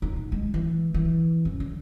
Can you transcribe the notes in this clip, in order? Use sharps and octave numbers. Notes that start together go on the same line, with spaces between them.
D#4
A#1
G#3
E3
E3
F#2
D3